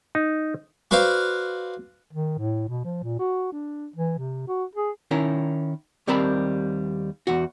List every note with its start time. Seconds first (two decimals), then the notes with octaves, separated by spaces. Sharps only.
0.15 D#4
0.91 F#4 B4 C5 D5 F5
2.13 D#3
2.38 A2
2.68 B2
2.84 F3
3.03 A#2
3.19 F#4
3.52 D4
3.96 E3
4.18 C3
4.48 F#4
4.75 G#4
5.11 D#3 C#4 E4 A#4
6.07 D#2 G3 C4 A#4 A5 B5
7.27 E2 F#4